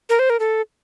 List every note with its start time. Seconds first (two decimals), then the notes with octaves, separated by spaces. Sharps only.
0.09 A#4
0.19 C5
0.30 A#4
0.40 A4